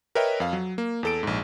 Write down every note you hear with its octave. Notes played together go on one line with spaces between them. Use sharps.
A#4 B4 C#5 D#5 E5 G5
F2 F5
F#3
A#3
E2 A4 D7
A#1 G#2